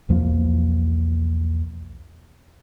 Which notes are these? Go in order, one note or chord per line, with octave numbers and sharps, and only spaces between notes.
B1 E2 F3 A#3